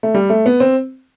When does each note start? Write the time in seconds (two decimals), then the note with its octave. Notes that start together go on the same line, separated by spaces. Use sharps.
0.03 A3
0.15 G3
0.30 A3
0.46 B3
0.60 C4